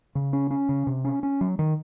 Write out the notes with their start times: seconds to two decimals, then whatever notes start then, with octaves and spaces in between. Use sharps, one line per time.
0.15 C#3
0.33 C#4
0.51 C#4
0.69 C#3
0.87 C3
1.04 C#4
1.23 C#4
1.41 F#3
1.59 D#3